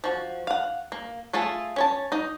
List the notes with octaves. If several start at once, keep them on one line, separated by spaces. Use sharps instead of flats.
F3 F#4
F5 F#5
A#3
A3 F4 G#4 A4
C#4 C#5 A5
D#4 D#5